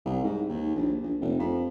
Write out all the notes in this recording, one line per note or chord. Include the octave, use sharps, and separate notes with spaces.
C2
G#2
D#2
A#1
A#1
F1
F2